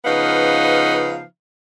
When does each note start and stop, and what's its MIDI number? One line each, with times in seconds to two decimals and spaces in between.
0.05 1.22 49
0.05 1.22 53
0.05 1.22 59
0.05 1.22 63
0.05 1.22 71
0.05 1.22 77